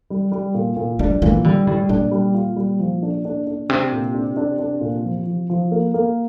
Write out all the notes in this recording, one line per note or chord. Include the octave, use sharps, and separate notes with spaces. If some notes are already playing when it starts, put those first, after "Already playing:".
G3
G3
A#2
A#2
G3 D4
A#2 E3
D3 G3
A2 G3
A#2 D4
G3
F4
G3
F3
D4
D4
D4
C3 D4
A#2
D4
D4
D4
A#2
F3
F3
F3
A#3
A#3